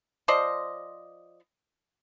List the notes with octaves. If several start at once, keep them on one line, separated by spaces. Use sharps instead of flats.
F3 C5 D5 D#5